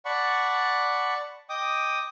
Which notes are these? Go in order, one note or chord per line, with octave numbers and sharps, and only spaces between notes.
D5 F#5 A5 B5 C#6
D#5 G5 D6 D#6